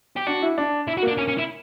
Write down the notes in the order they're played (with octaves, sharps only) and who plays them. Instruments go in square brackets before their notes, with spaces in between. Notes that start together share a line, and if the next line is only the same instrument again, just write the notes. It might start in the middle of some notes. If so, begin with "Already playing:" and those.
[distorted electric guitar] G4
[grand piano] D4 [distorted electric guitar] F#4
[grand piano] E4
D4
[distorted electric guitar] E4
F#4
[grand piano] A#3 [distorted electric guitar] D4
[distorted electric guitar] C#4
C#4
E4